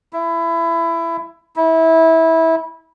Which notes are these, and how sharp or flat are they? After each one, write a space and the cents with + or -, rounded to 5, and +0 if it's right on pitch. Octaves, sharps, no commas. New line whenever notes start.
E4 +20
E4 -20